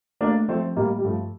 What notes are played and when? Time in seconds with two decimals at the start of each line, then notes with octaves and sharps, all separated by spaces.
0.21 A3 A#3 D4
0.49 F3 A3 C4
0.77 A2 G3 A#3
0.98 G3
1.04 G2 F3 A3